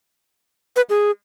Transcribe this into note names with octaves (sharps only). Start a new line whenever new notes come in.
B4
G#4